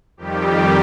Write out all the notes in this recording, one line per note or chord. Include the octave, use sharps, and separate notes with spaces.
F2 D#3 G3 G4